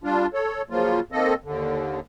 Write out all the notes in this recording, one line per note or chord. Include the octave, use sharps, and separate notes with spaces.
G3 D4 F4
A4 C#5
C#3 F3 F#3 A#3 F4
D#3 A#3 C4 A4 D#5
D#2 D3